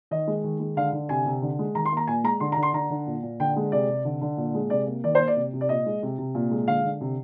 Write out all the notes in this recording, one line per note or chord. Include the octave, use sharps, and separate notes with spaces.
D#3 D#5
G#3
D#3
G#3
D3 F5
D3
C3 G#5
C3
D3
G#3
D#3 A#5
C6
A#3 A#5
A#2 G#5
G#3 A#5
D3 C6
A#5
D3
C6
D3 A#5
D3
A#2
A#2
D3 G5
G#3
C3 D5
C3
D3
D3
A#2
G#3
C3 D5
A#3
D#3 D5
A#3 C5
D5
C3
C3
D5
A#2 D#5
G#3
C3
C3
A#2
G#3
D3 F5
D3
C3